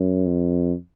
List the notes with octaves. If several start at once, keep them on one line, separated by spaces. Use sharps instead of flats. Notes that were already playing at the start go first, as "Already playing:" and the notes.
Already playing: F#2
F2